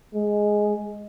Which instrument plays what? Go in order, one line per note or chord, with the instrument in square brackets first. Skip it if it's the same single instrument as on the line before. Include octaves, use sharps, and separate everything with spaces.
[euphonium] G#3